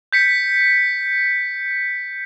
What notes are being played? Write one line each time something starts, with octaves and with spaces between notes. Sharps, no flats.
G6 B6 C#7